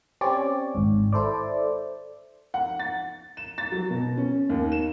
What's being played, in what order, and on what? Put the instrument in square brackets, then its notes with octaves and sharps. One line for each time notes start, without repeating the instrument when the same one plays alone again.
[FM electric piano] C4 C#4 G4 C#5 D5
G#1 G#2
E4 A4 C5 D5
[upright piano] F#5
A6
E7
A6
F#3
B2
C#4
D#2
E7